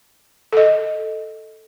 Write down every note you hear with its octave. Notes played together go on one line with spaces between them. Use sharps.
A4 D#5